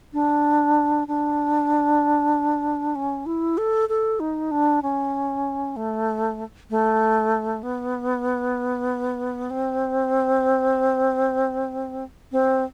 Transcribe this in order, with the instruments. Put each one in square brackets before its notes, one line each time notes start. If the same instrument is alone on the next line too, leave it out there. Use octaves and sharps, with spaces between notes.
[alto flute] D4
D4
C#4
E4
A4
A4
D#4
D4
C#4
A3
A3
B3
C4
C4